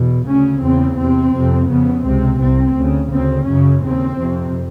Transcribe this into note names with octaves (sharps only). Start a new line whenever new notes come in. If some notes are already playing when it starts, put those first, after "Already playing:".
Already playing: E2 B2
D2 C#3 C#4
E2 C#3 C4
E2 C3 C4
F2 C3
F2 C#3 B3
C#2 C3 C4
C2 C3 C4
D2 C#3
D2 C#3 C4
F#2 C#3 C#4
D#2 C#3 C4
F2 C3